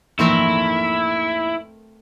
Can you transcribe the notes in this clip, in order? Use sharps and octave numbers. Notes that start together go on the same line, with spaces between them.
A#1 E2 G#2 A3 C4 E4 A#4